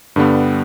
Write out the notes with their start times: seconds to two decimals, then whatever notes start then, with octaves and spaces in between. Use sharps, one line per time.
0.16 G2 D3 G3 B3